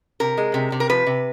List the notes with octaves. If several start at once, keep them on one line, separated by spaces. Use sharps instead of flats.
C3 A#4
G#3
C3
C3
A#4
F3 B4
C3